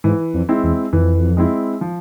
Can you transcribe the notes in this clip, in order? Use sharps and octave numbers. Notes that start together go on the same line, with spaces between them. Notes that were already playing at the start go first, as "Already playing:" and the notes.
G#2 E3
F2
G#3 C4 E4
E2
F2 E3
G#3 C4 E4
F3